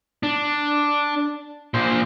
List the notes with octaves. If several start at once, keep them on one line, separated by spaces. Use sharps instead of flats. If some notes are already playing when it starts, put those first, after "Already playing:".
D4
A#2 C5